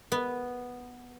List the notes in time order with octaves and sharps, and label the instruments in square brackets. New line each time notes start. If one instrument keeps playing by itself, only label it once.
[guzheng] B3